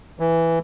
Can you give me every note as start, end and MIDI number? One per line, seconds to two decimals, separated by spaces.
0.20 0.59 52